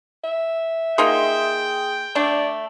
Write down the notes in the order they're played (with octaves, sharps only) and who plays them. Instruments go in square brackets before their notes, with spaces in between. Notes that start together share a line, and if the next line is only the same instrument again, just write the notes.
[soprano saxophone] E5
[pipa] A#3 D#4 F4 [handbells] G#4 C6 [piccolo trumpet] G5
[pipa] A3 D4 [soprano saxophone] D5 [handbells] A5